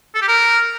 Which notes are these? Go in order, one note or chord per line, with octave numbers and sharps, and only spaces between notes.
A4
G4
A#4